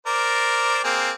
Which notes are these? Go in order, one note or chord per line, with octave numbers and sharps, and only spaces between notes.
A#4 C5 D5
A#3 C4 G#4